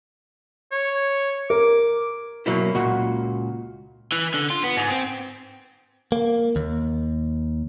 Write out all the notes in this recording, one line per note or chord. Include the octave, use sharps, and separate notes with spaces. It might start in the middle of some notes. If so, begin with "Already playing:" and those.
C#5
A#4 D6
B2 F#3 A#3 E4
C#2 A#2 F#4
E3
D3
F4
B3
G#2
C4
A#3
D#2